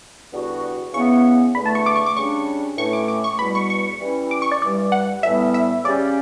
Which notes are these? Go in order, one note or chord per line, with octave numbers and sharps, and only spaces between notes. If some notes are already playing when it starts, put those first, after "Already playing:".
E2 D3 G3 B3 F#4
C#3 E3 B3 C#6
E2 D3 A3 B5
A5
C#6
D6
C#6
D6
C#3 G3 D4 C#6
A2 E3 A3 C#4 C#6
D6
D6
C#6
E2 B2 G3 B5
C#6
C#6
E3 G3 C#4 E4
D6
C#6
D5
G2 E3 G3 D5
F#5
A2 E3 G3 B3 E5
E5
C#3 G3 C#4 G4 D5